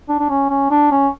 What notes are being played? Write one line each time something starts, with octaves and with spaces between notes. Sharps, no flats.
D4
D4
C#4
C#4
D4
C#4